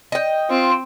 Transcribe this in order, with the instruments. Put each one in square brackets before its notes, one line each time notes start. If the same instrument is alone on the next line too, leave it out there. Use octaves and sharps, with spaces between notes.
[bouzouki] D#5 G5
[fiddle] C4 [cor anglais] F4